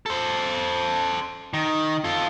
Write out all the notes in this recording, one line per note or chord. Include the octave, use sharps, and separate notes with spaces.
A4 C5
D#3
F4 A4